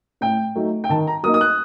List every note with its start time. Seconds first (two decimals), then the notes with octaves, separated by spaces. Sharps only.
0.21 A2 G5
0.55 F#3 A3 D#4
0.84 G5
0.89 D#3 A5
1.07 A#5
1.23 F#3 A#3 D#4 D#6
1.34 D#6
1.41 F#6